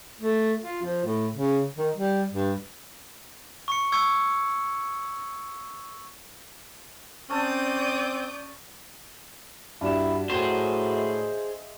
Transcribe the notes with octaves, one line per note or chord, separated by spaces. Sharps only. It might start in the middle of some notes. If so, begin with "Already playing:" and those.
A3
F4
F3
A2
C#3
D#3
G3
G2
C#6 C#7
C#6 E6 G#6 C#7
C4 C#4 D5 A5 D#6 G6
G2 G3 D4 E4 F#4 E7
A2 F#3 G#4 C5 G5 G#5 E7
G#3 E5